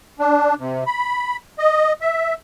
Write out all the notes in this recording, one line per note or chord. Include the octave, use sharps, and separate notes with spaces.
D4
C3
B5
D#5
E5